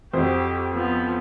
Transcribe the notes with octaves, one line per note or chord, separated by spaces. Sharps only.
F2 F#4 G4 C5
F3 B3